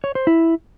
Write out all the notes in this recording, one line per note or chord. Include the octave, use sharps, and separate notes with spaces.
C#5
C5
E4